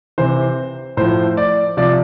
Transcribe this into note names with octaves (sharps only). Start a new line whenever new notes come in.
C3 E3 C5
A2 F3 C5
D5
C3 F3 D5